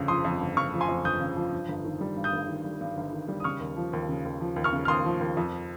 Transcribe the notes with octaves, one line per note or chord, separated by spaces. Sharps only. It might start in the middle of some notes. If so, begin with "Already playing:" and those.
Already playing: G1 F2 C#3
F3 C6 D#6
F2
G1
C#3 C#6 F6
F3
G#5 C6
F2
G1 D#6 G6
C#3
F3
G2
G1
D#3
G3
G2
D#6 G6
G1
D#3
G3
G2
G1
D#3
G3
D#6
C#3 C#6 F6
D#2
F3
D#2
C#3
D#2
F3
D#2
C#6 F6
C#3
F6
D#2 C6 D#6
F3
D#2
F2